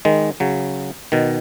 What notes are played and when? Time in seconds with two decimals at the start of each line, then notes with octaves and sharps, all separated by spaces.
0.05 D#3 G#3
0.40 C#3 F#3
1.12 B2 D#3